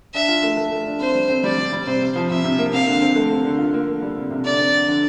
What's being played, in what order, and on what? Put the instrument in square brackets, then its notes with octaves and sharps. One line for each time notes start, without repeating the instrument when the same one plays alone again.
[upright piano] D4 [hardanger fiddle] E5
[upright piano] F4
A3
A3
A3
D4
[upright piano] C4 [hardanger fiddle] C5
[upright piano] G3
C4
[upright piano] G3 [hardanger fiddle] D5
[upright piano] G3
G3
[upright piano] C3 [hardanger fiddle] C5
[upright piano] C3
F3
[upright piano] C3 [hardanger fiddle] E5
[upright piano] C3
A#3
[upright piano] C4 [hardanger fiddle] F5
[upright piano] D3
C4
A3
C4
D3
F4
A#3
A#3
G3
C3
C3
[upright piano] D3 [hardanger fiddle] D5
[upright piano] C4
D3
D3